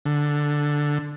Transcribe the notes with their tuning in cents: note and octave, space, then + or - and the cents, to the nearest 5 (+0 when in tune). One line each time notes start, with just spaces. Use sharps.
D3 +0